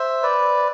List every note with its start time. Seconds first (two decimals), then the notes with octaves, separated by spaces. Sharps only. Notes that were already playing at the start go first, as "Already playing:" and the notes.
Already playing: C5 E5
0.23 B4 D5